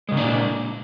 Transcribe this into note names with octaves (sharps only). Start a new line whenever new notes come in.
A#2 C#3 G#3 A#3 D4